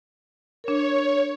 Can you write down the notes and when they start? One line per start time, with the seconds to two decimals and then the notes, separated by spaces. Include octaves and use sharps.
0.64 D4 A#4 C#5